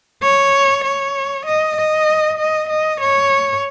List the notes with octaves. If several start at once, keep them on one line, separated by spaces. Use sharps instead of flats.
C#5
C#5
D#5
D#5
D#5
D#5
C#5